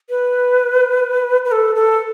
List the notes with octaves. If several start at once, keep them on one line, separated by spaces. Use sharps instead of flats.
B4
B4
A4
A4